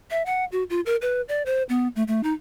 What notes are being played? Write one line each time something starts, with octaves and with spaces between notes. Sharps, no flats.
E5
F#5
F#4
F4
A#4
B4
D5
C5
B3
A3
A3
D#4